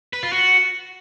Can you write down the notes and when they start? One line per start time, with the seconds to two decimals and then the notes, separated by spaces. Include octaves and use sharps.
0.13 B4
0.23 F4
0.32 F#4